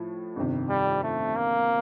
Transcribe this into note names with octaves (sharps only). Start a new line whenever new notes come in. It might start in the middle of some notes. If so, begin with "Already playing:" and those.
Already playing: A2 F3
G1 F2 C3 D#3
G3
A3
A#3